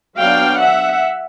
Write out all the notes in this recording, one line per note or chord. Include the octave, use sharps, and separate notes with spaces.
F#3 B3 D4 F5 G5
E5 F#5